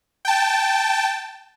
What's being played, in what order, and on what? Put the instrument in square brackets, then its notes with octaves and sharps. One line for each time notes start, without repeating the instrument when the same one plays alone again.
[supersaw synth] G5 A5